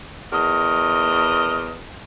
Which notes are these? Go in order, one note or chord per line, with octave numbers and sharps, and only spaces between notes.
E2 A#4 D#5